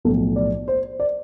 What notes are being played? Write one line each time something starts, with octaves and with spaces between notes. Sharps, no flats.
B1 A2 F3 A4
D5
C5
D5